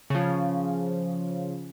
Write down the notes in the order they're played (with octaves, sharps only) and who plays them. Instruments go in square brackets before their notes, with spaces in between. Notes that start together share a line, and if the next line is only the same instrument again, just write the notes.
[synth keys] C#3 F3